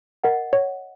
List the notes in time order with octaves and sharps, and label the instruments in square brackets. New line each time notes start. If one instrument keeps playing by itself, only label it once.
[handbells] A#4 [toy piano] D#5 F#5
[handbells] C#5